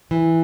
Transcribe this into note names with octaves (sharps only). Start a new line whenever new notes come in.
E3